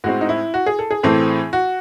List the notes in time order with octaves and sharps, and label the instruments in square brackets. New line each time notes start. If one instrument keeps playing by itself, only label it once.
[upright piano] A2 G#3 C4 F#4
D#4
E4
F#4
G#4
A4
G#4
A2 E3 A3 C4
F#4